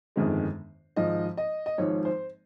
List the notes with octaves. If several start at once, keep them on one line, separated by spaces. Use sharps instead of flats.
G1 F2 D#3 G#3
G#1 G#2 F3 D#5
D#5
D#5
G#1 G#2 F3 C#5
C5